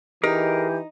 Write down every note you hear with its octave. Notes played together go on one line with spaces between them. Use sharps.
E3 D#4 G4 G#4 A#4